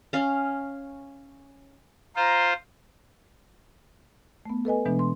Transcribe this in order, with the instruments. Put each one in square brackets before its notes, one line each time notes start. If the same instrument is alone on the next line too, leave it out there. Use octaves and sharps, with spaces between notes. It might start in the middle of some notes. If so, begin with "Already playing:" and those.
[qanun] C#4 F5
[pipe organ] F4 C5 [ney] A#5
[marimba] A3 B3
A4 B4 D#5 G#5
B2 E3 G#3 B3 D4
C6